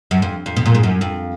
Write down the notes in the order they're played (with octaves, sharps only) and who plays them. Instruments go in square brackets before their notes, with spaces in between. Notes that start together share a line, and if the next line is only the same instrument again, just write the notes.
[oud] F#2
F2
F2
B2
A#2
G#2
F#2
F2